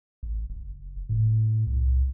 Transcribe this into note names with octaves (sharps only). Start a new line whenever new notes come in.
A1
F#1
A2
C2